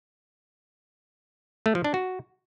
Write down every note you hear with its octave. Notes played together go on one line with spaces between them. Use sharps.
A3
F3
D4
F#4